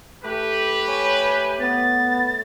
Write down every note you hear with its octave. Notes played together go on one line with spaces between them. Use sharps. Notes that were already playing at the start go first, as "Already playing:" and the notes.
A3 G4 B4
C#5 G#5
B3 A6